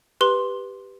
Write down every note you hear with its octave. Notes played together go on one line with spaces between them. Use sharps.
G4 B4 C6 G7